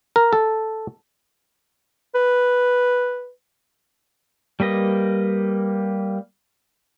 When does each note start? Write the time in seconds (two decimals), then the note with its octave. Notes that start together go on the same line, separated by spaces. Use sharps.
0.16 A#4
0.33 A4
2.15 B4
4.60 G3 A#3 B4 D#5